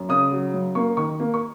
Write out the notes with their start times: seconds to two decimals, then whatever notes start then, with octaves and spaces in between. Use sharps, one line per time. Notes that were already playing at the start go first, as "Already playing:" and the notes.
Already playing: F#2
0.09 C#3 D#6
0.32 F#3
0.54 F#2
0.75 A#3 C#6
0.97 D#3 C#6
1.20 A#3
1.34 C#6